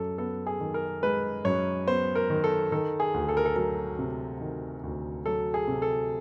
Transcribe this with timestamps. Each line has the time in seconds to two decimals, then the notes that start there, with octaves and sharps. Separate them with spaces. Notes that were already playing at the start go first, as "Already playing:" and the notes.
Already playing: F#2 A4
0.18 B3 A4
0.47 G#4
0.60 D#3
0.74 A#4
1.03 G#3 B4
1.45 F#2 C#5
1.87 B3 C5
2.15 A#4
2.30 D#3
2.44 A4
2.72 D#3 A4
3.00 G#4
3.14 D2
3.29 A4
3.37 A#4
3.45 A4
3.56 F#3 A#4
3.99 C3
4.41 D#3
4.83 D2
5.26 F#3 A4
5.54 G#4
5.68 C3
5.82 A4